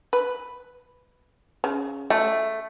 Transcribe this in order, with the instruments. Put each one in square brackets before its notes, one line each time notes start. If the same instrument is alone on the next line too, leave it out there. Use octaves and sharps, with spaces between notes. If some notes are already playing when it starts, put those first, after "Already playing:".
[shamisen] B4
C#3
[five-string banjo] A3